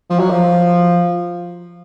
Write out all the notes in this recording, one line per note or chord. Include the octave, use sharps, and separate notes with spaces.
F3
F#3
F3